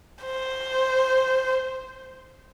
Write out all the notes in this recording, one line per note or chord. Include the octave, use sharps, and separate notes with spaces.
C5